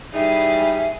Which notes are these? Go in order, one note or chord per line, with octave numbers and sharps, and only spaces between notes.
E3 G3 D#4 G#4 E5 A6